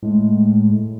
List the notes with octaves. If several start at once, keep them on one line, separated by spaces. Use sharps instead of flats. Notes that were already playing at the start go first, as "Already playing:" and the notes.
A2 G#3